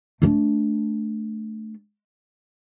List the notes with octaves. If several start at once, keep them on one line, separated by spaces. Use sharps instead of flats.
A3 D4